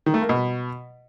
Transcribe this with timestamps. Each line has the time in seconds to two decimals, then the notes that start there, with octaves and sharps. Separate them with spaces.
0.06 D#3
0.14 A3
0.22 A#3
0.29 B2